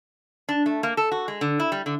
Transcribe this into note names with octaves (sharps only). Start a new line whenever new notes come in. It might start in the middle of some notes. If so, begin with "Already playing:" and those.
D4
A3
A#3
A4
F#4
G#3
D3
E4
G3
D3